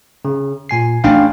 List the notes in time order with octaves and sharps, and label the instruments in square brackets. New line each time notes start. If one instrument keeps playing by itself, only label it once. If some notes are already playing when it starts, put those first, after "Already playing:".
[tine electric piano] C#3
A#2 G#5 C7
[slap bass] A1 D4 [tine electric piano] F5 G5 G#5